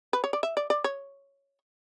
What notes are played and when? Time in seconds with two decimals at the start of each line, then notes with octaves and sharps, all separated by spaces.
0.13 B4
0.24 C#5
0.33 D5
0.43 E5
0.57 D5
0.70 D5
0.84 C#5